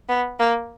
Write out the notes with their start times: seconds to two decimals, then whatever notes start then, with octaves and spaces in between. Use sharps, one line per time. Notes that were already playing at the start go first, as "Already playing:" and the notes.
0.09 B3
0.39 A#3